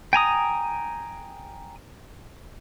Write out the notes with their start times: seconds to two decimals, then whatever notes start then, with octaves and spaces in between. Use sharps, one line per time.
0.13 G5 G#5 A#5 D#6